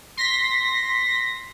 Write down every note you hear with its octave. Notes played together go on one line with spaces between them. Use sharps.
C6 A#6 B6